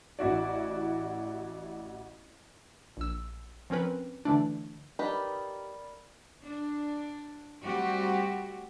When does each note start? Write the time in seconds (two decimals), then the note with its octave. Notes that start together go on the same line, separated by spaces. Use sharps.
0.19 A1 E4 F#4 D5
2.97 A#1 E6
3.70 F3 C4 C#4 A#4 B4
4.25 D3 E3 A3 D4
4.99 D#4 G4 A#4 B4 D5 B5
6.43 D4
7.62 G3 A3 C4 F#4 G4